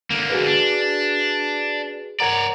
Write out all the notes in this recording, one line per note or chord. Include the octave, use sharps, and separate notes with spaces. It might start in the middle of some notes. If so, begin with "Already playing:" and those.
D3 A#3
F#4 G#4 B4
D4
A#4 C#5 D5 F#5 A#5